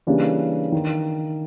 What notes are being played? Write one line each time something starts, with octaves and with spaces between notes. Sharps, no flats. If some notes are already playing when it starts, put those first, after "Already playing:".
C#3 E3 G3 A#3 D4
D#3